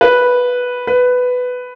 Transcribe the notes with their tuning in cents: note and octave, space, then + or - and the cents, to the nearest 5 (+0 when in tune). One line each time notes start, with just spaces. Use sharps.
B4 -5
B4 +10